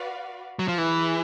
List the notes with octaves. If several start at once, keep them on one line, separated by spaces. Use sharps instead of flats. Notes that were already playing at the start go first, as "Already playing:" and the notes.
Already playing: F#4 B4 D5 F5
F#3
F3
E3 E4 G#4 B4